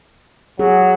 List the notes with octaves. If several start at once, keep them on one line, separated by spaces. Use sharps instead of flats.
F#3 G#4